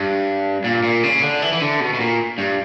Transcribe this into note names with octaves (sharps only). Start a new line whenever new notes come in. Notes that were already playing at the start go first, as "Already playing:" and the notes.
Already playing: G2
A#2
A#2
C#3
D3
E3
E3
D3
B2
B2
A#2
G2